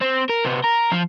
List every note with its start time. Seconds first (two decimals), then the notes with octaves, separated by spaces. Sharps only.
0.01 C4
0.29 A#4
0.45 C3 B3
0.64 A#4
0.92 F3